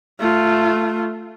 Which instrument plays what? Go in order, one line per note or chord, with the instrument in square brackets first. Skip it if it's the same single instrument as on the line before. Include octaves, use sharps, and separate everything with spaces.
[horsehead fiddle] A3 F4